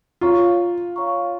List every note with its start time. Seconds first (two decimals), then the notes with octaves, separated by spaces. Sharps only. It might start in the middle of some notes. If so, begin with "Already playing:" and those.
0.21 F4 C#5 F5 A#5 C#6
0.96 C#5 F5 A#5 C#6